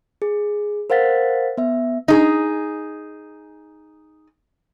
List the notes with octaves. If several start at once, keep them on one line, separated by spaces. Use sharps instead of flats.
G#4
A#4 C5 F5 F#5 A6 B6
B3 E5
D#4 G#4